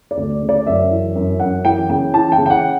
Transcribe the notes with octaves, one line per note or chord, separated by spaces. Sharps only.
D5
D2
C#3
D5
F#2 E5
E3
F#2
F#2 F#5
E3 G5
C#3 G5
E3 A5
G5
C#3
G5
F#5